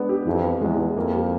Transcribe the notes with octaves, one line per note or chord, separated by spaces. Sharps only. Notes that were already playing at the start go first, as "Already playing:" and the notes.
Already playing: G#3 B3 D4
G4
F2 E3
B3
E2 G#3
E3
F2 A#3
G4